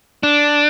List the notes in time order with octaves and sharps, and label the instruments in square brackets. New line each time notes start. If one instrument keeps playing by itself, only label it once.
[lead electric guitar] D4